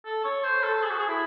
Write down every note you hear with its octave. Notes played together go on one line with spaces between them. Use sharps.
A4
C#5
C5
A4
G#4
F#4
G#4
E4